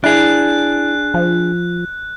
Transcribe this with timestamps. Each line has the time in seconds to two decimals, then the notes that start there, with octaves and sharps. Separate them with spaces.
0.04 D4 E4 G#4 F#6
1.14 F3